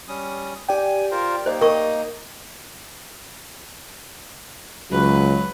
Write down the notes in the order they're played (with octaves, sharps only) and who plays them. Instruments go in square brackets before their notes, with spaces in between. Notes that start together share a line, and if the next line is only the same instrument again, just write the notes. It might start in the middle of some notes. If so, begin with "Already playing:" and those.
[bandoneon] G3 C#4 D#6
[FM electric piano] G4 D5 G5 [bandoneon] G#5
[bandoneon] F4 A#4 C5
[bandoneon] A#3 D#4 [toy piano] C5 D#5
[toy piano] A#4 C#6 [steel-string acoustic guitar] D#5
[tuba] C#2 [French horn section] F#3 [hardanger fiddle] B4